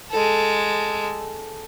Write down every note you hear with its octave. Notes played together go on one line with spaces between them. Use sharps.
G#3 A4